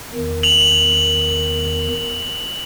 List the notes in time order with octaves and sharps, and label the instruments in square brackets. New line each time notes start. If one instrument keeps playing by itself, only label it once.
[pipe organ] E2 D#3
[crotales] F7 F#7